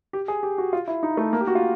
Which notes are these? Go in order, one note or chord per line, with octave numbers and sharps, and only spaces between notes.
G4
G#4
G4
F#4
F4
E4
D#4
A3
A#3
G4
F#4
F4